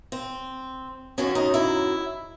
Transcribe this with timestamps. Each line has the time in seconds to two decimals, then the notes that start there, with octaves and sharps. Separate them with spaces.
0.12 C4
1.18 F#2 D#3 F#3 C#4
1.35 D#4
1.54 E4